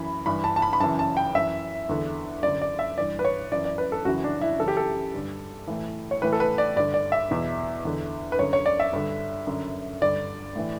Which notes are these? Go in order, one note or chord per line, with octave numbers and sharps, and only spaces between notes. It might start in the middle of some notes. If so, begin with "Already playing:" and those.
Already playing: F#2 E3 B5
G2 E3 B5
A5
A5
B5
B5
F#2 C#3 E3 A5
A5
G5
F#2 E3 E5
E2 D3
F#2 D3 D5
D5
E5
G2 E3 D5
B4
C#5
F#2 E3 D5
D5
B4
A4
F#2 C#3 E3 F#4
D4
E4
F#2 C#3 E3 A4
G4
A4
G2 D3
A2 E3
C#5
A2 E3 B4
A4
B4
D5
G2 D3 D5
D5
E5
E2 B2
E2 D3
B4
F#2 D3 C#5
C#5
D5
E5
G2 D3
F#2 D3
G2 D3 D5
A2 E3